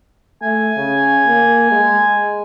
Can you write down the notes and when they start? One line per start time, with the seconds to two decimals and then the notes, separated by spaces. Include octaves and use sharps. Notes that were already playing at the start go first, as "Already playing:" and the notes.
0.42 A3 G#5
0.77 C#3
1.26 A#3
1.71 G#3